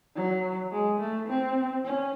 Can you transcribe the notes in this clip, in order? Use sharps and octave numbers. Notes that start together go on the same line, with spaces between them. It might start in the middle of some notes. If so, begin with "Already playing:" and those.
F#3
G#3
A3
C4
C#4